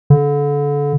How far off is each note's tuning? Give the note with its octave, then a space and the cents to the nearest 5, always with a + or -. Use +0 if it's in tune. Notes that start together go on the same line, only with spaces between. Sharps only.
D3 -30